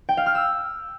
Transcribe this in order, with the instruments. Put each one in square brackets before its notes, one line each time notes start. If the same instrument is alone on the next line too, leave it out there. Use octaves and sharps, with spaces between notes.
[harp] G5
F5
F6
E6